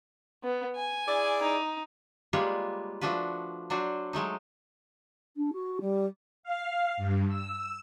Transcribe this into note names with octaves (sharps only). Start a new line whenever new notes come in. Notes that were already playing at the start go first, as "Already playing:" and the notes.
B3
G#5
E4 G#4 D5
D#4
G3 G#3 A#3 F4 B4 C#5
F3 A3 D4 F#4 B4
F#3 D4 F#4 C5
F#3 G#3 A3 D#4
D4
F#4
G3
F5
G2
E6